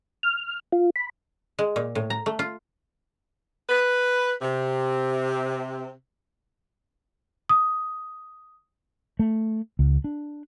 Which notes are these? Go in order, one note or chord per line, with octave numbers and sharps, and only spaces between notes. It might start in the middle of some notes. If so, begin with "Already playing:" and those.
F6
F4
B5
G#3
A#2
A2
A#5
A3
F4
B4
C3
D#6
A3
C#2
D4